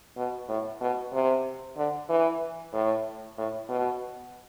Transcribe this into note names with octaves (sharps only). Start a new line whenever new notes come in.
B2
A2
B2
C3
D3
E3
A2
A2
B2